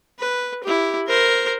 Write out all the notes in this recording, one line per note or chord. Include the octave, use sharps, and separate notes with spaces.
B4
E4 G4
A#4 C5